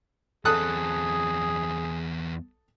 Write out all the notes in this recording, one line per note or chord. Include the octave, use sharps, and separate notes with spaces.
E2 C4 G#4 A4 D#6 F#6